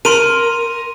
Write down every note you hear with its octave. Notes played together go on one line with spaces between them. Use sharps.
A#4 C6 D#7